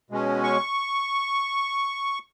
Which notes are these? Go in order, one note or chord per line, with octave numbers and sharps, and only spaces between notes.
B2 G#3 C#4
C#6